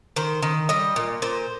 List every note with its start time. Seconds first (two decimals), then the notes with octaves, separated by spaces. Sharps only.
0.16 D#3 C5
0.42 D#3
0.69 G3 D#5
0.96 A#2
1.22 A#2 C5